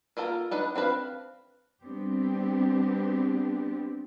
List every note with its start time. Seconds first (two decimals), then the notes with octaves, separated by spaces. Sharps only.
0.17 A#3 F4 A4 A#4
0.51 D4 D#4 B4
0.75 C4 D4 B4 F5
1.83 G3 B3 C4 D4 G4